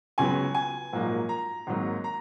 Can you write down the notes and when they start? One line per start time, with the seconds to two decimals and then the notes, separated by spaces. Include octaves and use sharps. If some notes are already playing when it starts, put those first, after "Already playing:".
0.18 C#2 C#3 F#3 B3 G#5
0.55 G#5
0.93 A#1 G#2 F#3 A#3
1.29 A#5
1.67 G#1 G#2 F#3 A#3
2.04 A#5